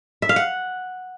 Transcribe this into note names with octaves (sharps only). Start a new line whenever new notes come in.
E5
F5
F#5